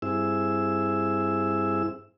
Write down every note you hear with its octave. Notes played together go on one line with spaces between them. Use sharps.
G2 C4 E4 G#4 E6